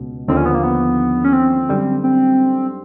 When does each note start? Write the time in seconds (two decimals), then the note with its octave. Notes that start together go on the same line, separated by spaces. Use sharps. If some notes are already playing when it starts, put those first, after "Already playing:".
Already playing: C#2 B2
0.28 D#2 D3 F3 C4
0.37 C#4
0.46 B3
0.55 A#3
0.63 B3
1.25 C#4
1.33 C4
1.69 F#2 D3 G3
2.04 C4